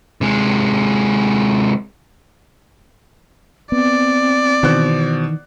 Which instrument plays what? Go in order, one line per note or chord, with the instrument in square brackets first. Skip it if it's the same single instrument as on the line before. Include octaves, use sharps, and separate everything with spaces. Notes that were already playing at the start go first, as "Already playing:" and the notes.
[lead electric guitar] C3 G#3
[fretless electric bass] B3 [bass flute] C4 [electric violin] D5
[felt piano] B2 C5 F#6 [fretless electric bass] D#3 E3